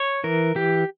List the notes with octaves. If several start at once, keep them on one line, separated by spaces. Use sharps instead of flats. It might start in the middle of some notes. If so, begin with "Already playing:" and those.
Already playing: C#5
E3 A#4
E3 G4